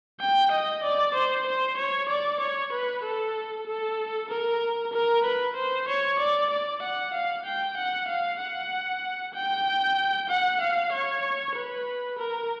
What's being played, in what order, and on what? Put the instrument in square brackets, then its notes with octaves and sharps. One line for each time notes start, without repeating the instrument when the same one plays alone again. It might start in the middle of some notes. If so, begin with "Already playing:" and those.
[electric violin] G5
D#5
D5
C5
C5
C#5
D5
C#5
B4
A4
A4
A#4
A#4
B4
C5
C#5
D5
D5
F#5
F5
G5
F#5
F5
F#5
G5
F#5
F5
C#5
B4
A#4